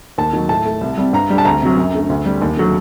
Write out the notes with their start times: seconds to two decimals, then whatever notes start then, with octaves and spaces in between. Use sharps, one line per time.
0.18 D#2 A5
0.33 D#3 F#3
0.49 A2 A5
0.65 A3
0.81 C2
0.98 C3 G3
1.13 G2 A#5
1.30 D3 G3
1.38 A5
1.45 D2 A#5
1.62 C3 F#3
1.77 F#2
1.94 D3 A3
2.10 D2
2.25 D3 G3
2.42 D#2
2.57 D3 F#3 A3